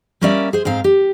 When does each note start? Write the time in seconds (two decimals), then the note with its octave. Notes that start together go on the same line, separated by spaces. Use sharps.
0.21 G3 A#3 C#4 A#4 D5 E5
0.53 G#4 C5
0.65 G#2 C4 F5 A#5
0.84 G4